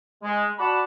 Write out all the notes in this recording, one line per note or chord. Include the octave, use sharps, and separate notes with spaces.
G#3
F#4 D5 F#5 A5 B5